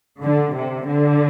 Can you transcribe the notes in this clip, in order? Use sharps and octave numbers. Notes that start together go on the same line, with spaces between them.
D3
C3
D3